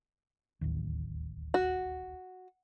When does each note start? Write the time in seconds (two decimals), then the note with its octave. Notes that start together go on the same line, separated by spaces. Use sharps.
0.61 D1 A1 D#2
1.54 F#4